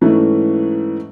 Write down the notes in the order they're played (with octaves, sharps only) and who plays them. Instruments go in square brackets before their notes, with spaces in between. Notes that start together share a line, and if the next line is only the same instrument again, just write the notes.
[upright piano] G#2 E3 A3 C#4